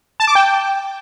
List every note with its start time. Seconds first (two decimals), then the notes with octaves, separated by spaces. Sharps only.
0.20 A5
0.28 D6
0.35 G5